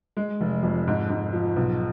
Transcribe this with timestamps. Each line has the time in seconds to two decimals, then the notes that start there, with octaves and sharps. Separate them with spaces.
0.17 G#3
0.41 F1
0.63 F2
0.87 G#2
1.10 G#2
1.33 F3
1.56 B1